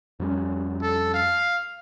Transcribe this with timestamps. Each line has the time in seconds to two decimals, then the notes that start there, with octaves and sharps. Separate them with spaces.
0.20 F2 G3 C#4
0.82 A4
1.14 F5